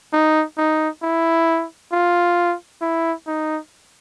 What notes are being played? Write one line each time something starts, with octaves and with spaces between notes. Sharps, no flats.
D#4
D#4
E4
F4
E4
D#4